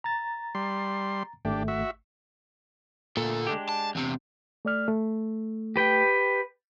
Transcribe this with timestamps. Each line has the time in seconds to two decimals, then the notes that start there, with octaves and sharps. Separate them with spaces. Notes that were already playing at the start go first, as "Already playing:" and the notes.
0.04 A#5 A6
0.55 G3 C6
1.45 G#1 A3 D4 G4
1.68 F#4 E5
3.17 D2 A#2 A4
3.47 G#3 D4 G4
3.69 A5
3.95 E2 C3
4.65 A3 D5 F6
4.88 A3
5.76 G4 B4 G5